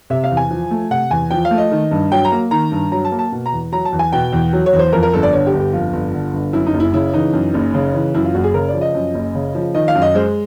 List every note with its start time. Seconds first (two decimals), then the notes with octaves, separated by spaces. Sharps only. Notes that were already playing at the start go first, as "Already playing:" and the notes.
0.10 C3 E5
0.24 F5
0.30 E2
0.37 G#5
0.51 F3
0.71 A3
0.91 C3 F#5
1.10 E2 G#5
1.31 F3 G5
1.45 F5
1.51 A3
1.58 D#5
1.71 D#3
1.91 G2
2.12 F#3 G5
2.25 A#5
2.32 A#3
2.51 D#3 A#5
2.71 G2
2.92 F#3 A#5
3.05 A5
3.12 A#3
3.19 A5
3.32 B2
3.46 A#5
3.52 E2
3.72 F#3 A#5
3.85 A5
3.92 E2
3.99 G#5
4.13 B2 G5
4.33 E2
4.53 F#3
4.66 C#5
4.73 E2
4.79 C5
4.93 F2 A#4
5.03 A#4
5.13 G1 A4
5.23 D5
5.33 D3 C#5
5.47 G4
5.53 G1
5.60 G4
5.73 F2 F4
5.93 G1
6.14 D3
6.33 G1
6.53 F#2 E4
6.66 D#4
6.74 F#1
6.80 E4
6.93 C#3 E4
7.14 E3 D#4
7.33 F#2
7.54 F#1
7.74 C#3
7.94 E3
8.14 F#2 E4
8.24 F4
8.34 F#1 F#4
8.44 G#4
8.54 C#3 A#4
8.68 D5
8.74 F3
8.81 D#5
8.95 F#2
9.14 F#1
9.35 C#3
9.55 F3
9.75 D#3 D#5
9.88 F5
9.95 F#2
10.02 D#5
10.15 G#3 C5